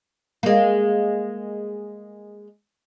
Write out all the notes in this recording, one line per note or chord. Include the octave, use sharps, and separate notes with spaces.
G#3 A#3